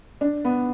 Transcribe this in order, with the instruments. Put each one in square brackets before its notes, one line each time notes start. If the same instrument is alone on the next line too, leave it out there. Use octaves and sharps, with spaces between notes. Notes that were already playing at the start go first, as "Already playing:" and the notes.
[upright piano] D4
B3